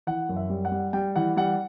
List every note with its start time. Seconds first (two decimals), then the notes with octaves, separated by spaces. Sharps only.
0.07 E3 F#5
0.29 F#2
0.36 E5
0.50 G3
0.65 F#5
0.72 G3
0.93 G3 G5
1.16 E3 F#5
1.37 G3 F#5